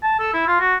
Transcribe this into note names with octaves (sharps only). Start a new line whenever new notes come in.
A5
A4
E4
F4
F#4